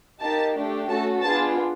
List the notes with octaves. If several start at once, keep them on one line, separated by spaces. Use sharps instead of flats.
A#3 D#4 G4 A5
A3 D4 G4
A3 C#4 F#4 A4 A5
B3 D4 F4 G#4 A5